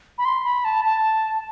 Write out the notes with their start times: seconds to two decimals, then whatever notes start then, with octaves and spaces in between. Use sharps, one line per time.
0.18 B5
0.25 C6
0.45 B5
0.65 A5
0.85 A5